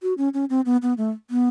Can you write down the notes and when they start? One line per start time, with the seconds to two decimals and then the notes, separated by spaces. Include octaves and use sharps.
0.02 F#4
0.18 C#4
0.34 C#4
0.50 C4
0.66 B3
0.82 B3
0.98 A3
1.31 B3